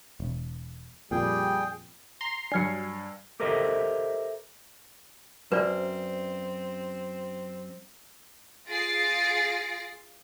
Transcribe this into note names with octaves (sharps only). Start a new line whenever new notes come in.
E1
F2 A#2 G3 G#4 G5
A#5 C6
G2 F#3 D4 G#5 F6 G#6 C7 C#7
G4 A4 A#4 C5 D#5 E5
F#2 C4 B4 C5 D5
F4 G#4 A6 A#6 C7 D7